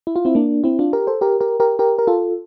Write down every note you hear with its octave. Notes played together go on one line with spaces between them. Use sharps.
E4
F4
C4 E4
A#3 D4
C4 E4
D4 F4
G4 A#4
A4 C5
G4 A#4
G4 A#4
G4 A#4
G4 A#4
A#4
F4 A4